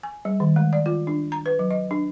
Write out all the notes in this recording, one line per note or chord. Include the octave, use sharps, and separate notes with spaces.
G#5
G3
D#3
G#3
D5
F4
D4
A#5
B4
F#3
D#5
D4